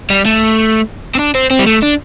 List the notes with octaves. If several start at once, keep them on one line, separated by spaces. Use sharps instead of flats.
G3
A3
C4
D4
C4
C4
G3
A3
D4